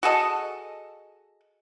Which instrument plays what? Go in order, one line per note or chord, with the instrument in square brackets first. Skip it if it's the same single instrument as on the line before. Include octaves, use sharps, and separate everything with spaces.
[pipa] F#4 G#4 A4 D#5